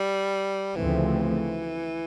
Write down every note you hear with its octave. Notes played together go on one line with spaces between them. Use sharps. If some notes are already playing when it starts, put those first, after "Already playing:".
Already playing: G3
D2 C#3 E3 F3 A3 C4